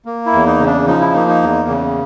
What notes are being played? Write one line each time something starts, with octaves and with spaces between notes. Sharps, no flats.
A#3
E4
E2
D#4
C#3
D4
F3 D#4
E4
A#3 D#4
D#4
E2
C#3